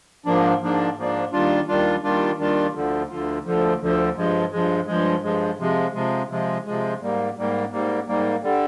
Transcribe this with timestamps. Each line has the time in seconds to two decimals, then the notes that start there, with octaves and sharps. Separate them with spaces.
0.26 G#2 F3 A#3 D4
0.62 G#2 F3 A#3 D4
0.96 G#2 F3 A#3 D4
1.33 D#2 D#3 G3 D4 F4
1.68 D#2 D#3 G3 D4 F4
2.03 D#2 D#3 G3 D4 F4
2.38 D#2 D#3 G3 D4 F4
2.74 D2 D3 F3
3.10 D2 D3 F3
3.45 D2 D3 F3
3.81 D2 D3 F3
4.16 G2 F3 G#3
4.52 G2 F3 G#3
4.87 G2 F3 G#3
5.22 G2 F3 G#3
5.59 C3 F3 G#3
5.94 C3 F3 G#3
6.29 C3 F3 G#3
6.65 C3 F3 G#3
7.01 G#2 G3 A#3
7.37 G#2 G3 A#3
7.71 G#2 G3 A#3
8.08 G#2 G3 A#3
8.43 D3 G3